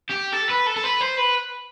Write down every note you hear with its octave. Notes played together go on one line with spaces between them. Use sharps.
G4
A4
B4
A4
A4
B4
C5
B4